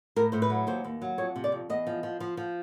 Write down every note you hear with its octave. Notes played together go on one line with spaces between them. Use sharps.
A2 A#4
A2 C5
B4
F#3
D#2 C5
D#2
F#3
F2 C#5
C3
D5
F2
E2 D#5
F3
F3
F3
F3